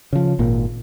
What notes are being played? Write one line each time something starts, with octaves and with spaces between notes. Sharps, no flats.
C#3 F3
G#1 A#2 A#3